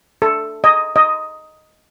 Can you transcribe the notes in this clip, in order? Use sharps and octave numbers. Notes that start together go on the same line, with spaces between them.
A4
D#5
D#5